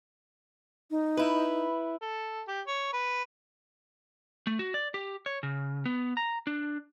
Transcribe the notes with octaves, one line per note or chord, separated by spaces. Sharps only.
D#4
E4 B4
A4
G4
C#5
B4
A3
F#4
D5
G4
C#5
C#3
B3
A#5
D4